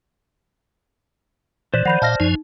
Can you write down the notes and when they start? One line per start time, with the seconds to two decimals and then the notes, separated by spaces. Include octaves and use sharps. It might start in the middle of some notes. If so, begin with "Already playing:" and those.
1.74 A#2 E3 C5 D5 F#6
1.85 D#3 F3 F#5 B5 G6
2.02 A#2 D#5 F5 A5 F6 A#6
2.20 F#2 F3 D#4 G#5